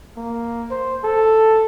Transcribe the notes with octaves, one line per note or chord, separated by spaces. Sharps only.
A#3
C5
A4